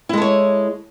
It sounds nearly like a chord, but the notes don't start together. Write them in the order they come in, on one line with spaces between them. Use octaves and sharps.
E4 G#3 A4 C#5